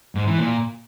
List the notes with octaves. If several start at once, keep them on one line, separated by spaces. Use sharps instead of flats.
G#2
E3
A#2